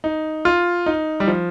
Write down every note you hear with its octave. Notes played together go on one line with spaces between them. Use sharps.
D#4
F4
D#4
G3
F3